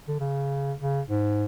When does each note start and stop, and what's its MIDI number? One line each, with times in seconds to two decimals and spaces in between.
0.08 0.16 50
0.20 0.73 49
0.80 1.01 49
1.08 1.46 44